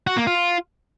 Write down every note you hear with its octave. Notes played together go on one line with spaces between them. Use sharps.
F#4
A#3
F4